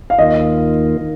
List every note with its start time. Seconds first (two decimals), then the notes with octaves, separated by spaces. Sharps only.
0.10 F5
0.19 D#2 D#3 A#3 F4 D#5
1.01 D#3